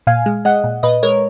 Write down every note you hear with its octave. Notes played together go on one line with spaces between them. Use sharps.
A#2 F5 G#5
G#3
G#3 D#5 F#5
A#2
A#2 B4 D#5
G#3 A#4 C#5